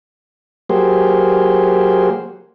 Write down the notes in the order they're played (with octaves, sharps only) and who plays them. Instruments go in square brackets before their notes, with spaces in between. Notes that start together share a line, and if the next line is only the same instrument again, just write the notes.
[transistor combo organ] F#3 A#3 G4 G#4 C5